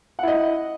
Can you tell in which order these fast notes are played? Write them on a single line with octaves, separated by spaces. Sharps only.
F#5 E4 D#5